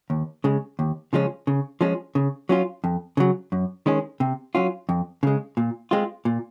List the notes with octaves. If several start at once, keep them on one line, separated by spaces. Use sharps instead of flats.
D#2
C#3 G#3
D#2
C#3 F3 G#3 C#4
C#3
F3 G#3 C#4
C#3
F#3 C#4 F4
F2
C#3 F#3
F#2
D#3 G#3 C#4
C3
F#3 C#4 F4
F2
C#3 G#3
A#2
G#3 C4 F4
A#2